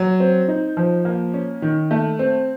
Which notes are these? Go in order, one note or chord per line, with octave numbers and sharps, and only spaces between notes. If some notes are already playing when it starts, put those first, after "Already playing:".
Already playing: F#3
C4
D#4
F3
A#3
C#4
D#3
A3
C4